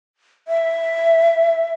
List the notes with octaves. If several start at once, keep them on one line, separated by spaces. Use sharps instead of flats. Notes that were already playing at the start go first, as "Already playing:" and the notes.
E5